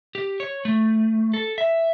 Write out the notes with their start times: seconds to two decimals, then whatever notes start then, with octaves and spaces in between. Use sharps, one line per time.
0.15 G4
0.40 C#5
0.65 A3
1.34 A4
1.58 E5